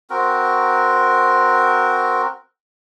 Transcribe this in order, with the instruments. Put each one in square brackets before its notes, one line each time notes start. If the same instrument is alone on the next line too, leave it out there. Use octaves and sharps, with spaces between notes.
[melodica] C4 F#4 A#4